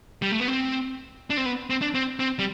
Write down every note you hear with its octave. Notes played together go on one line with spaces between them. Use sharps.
G3
A3
B3
C4
D4
C4
B3
C4
D4
C4
C4
G3